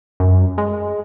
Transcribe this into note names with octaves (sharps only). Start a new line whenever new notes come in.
F#2
G#3